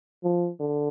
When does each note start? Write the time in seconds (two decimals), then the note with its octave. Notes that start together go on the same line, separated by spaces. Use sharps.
0.23 F3
0.60 D3